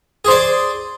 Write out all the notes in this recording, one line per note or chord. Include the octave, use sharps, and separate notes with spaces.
G#4 C5 D5